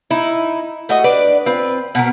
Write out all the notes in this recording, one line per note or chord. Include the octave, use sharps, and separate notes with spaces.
D#4 E4
A3 F#4 D#5
D4 B4 D5
C4 F4 B4
B2 B3 A#4